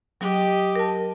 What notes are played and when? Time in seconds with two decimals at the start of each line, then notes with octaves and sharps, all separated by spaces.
0.21 F#3 G4 D#5
0.76 A#4 A5